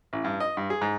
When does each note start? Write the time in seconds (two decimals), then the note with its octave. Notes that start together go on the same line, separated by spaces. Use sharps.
0.13 A1
0.24 G2
0.40 D#5
0.57 G2
0.70 G#4
0.82 G#2